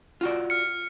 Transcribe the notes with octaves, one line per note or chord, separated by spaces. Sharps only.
F4 F#4 D5
F6 C#7